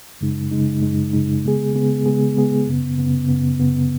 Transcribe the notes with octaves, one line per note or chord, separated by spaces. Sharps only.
F#2 C#3 G#3 D#4
F#2 C#3 G#3 D#4
F#2 C#3 G#3 D#4
F#2 C#3 G#3 D#4
C#3 G#3 B3 G#4
C#3 G#3 B3 G#4
C#3 G#3 B3 G#4
C#3 G#3 B3 G#4
F#2 C#3 B3
F#2 C#3 B3
F#2 C#3 B3
F#2 C#3 B3